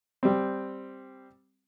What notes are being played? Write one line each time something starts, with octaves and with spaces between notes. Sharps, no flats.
G3 C4